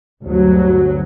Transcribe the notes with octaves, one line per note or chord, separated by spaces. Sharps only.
G1 D2 F#3